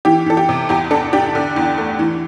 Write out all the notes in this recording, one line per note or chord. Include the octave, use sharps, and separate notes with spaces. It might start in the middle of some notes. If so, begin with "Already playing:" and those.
E3 G4
E3 A4
G4
C3
E2 G4
D4 A4
D4 G4
D3
E2
A3
E3